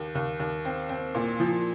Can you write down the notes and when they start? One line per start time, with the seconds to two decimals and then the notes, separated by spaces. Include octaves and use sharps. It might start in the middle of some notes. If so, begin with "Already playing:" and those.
Already playing: D#2
0.15 D#2
0.40 D#2
0.65 C4
0.89 C4
1.15 A#2
1.40 F3